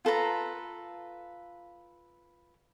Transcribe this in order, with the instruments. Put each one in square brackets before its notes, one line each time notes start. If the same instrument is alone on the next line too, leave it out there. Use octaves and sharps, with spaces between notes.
[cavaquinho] F4 A4 B4 A#5